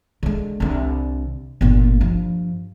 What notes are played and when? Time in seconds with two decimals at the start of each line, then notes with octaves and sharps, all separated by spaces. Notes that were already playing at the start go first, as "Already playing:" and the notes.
0.23 D3 G#3
0.60 C2 D3
1.61 G1 A#2
2.01 G2 F3